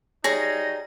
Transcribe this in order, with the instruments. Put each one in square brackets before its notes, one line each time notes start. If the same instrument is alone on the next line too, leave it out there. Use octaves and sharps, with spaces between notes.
[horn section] F#3 G3 D#4 [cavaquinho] G#4 A#5 [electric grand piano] C#5 [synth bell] A#6